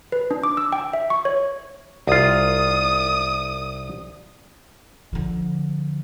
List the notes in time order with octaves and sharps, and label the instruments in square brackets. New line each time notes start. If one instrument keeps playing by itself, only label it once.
[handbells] B4
D4
D6
E6
G5
E5
C#6
C#5
[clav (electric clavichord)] C2 F4 [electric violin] D#6
[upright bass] D3 F3